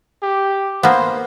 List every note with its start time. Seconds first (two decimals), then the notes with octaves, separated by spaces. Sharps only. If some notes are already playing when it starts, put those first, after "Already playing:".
0.22 G4
0.83 A#3 B3 C5